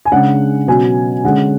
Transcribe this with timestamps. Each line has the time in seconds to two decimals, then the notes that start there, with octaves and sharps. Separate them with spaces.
0.05 G#5
0.12 C#3 G#3 D4 F#5
0.67 B2 F#3 C#4 G#5
1.24 D3 G#3 C#4 F#5